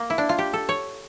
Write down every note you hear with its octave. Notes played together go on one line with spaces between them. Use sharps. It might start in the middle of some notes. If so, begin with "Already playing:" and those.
Already playing: A#3
E4
D4
F4
G4
A4
C#5